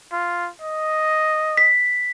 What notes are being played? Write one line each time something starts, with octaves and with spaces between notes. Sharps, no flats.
F4
D#5
B6